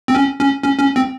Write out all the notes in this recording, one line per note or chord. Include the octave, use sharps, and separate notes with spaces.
C4
C#4
C#4
C#4
C#4
C4